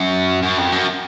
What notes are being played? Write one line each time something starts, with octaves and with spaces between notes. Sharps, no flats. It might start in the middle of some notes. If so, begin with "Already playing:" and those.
Already playing: F#2
F#2
F2
F#2